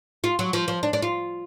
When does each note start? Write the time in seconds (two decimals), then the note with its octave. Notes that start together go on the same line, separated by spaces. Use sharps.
0.24 F4
0.39 F#3
0.53 F3
0.68 F3
0.83 D4
0.93 D4
1.02 F4